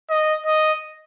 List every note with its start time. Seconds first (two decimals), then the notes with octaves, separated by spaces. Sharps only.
0.10 D#5
0.47 D#5